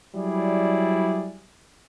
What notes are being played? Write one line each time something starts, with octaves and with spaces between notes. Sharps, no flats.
F#3 G3 E4 G#4 D5